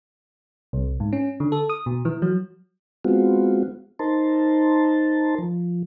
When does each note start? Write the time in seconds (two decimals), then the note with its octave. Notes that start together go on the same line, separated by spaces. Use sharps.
0.73 C2
1.00 G#2
1.13 C#4
1.40 D3
1.52 A4
1.69 D#6
1.86 B2
2.05 E3
2.22 F#3
3.05 G#3 B3 C4 F4 F#4
3.99 D#4 A#4 C5 A5
5.39 F3